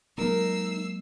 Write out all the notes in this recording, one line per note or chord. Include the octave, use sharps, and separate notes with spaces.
F#3 G#3 A#3 D#4 A#4 E6 C7